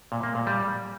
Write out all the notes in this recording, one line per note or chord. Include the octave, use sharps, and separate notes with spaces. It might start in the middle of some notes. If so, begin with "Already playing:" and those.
A#2
A#3
A#2
G3